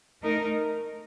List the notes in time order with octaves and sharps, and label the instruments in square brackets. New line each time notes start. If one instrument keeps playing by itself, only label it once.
[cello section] A3 D#4 A#4